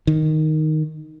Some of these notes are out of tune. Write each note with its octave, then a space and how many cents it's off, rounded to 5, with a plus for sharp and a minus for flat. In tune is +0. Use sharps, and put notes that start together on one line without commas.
D#3 +0